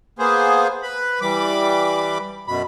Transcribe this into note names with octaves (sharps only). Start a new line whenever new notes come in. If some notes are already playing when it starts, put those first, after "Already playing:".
A#3 B3 G#4 C5
B4 B5
E3 G3 B5 D6
F#2 B2 B5